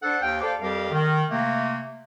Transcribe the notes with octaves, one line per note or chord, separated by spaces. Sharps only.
D4 A4 C5 F#5
D#2 F5 G5
A4 C5 D5 F5 D6
F2 G3 G4 A#4 F5
D#3
C3 A3 A#3